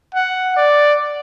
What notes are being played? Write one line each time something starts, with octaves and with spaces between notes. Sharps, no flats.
F#5
D5